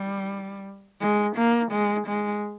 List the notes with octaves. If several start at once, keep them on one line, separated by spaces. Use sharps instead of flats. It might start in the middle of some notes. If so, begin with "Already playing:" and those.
Already playing: G3
G#3
A#3
G#3
G#3